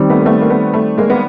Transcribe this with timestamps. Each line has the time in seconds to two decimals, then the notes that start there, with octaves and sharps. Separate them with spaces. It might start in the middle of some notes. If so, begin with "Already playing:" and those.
Already playing: D#3 G3 C4
0.10 A3 B3
0.21 A#3
0.26 A3 B3
0.41 A#3
0.50 A3 B3
0.74 A3
0.98 G#3 A#3
1.10 B3